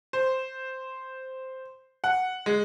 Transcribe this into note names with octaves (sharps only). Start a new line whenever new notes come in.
C5
F#5
G#3